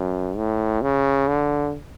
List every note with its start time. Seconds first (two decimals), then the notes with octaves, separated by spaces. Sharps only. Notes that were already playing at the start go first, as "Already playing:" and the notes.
Already playing: F#2
0.37 A2
0.82 C#3
1.28 D3